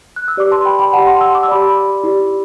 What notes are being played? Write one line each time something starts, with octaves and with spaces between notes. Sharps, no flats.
F#6
E6
G4 B4 D5 D6
A5 C6
G5 B5
G5 B5
G4 D5 F#5 A5
A5 C6
C6 E6
D6
E6
G4 D5 B5 D6
E4 G4 D5